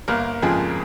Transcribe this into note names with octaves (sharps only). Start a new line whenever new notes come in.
G1 A#3 A#4
F2 C#3 F3 G#3 G#4